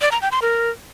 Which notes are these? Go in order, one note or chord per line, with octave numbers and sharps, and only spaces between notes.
D5
A#5
G5
C6
A#4